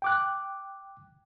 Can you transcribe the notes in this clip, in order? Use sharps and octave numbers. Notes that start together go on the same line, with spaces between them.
G5 D6 F#6